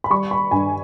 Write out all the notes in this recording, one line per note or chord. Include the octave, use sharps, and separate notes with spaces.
B5
G3 C#6
B5
G2 G#5